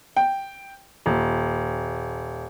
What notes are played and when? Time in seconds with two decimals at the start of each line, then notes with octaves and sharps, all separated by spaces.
0.17 G5
1.06 D#1